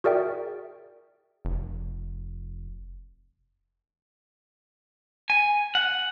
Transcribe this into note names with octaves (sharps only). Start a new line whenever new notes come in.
F#4 G#4 A#4 D5 E5 G5
F1
G#5
F#5